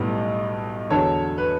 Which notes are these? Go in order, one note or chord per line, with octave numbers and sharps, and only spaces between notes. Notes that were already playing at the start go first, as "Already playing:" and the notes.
Already playing: B1 A2 G3 B3
E2 D3 F#3 A4 C#5
B4